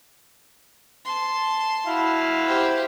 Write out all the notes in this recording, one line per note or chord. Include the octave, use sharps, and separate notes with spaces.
A5 C6
E4 F#4 F5
G4 C5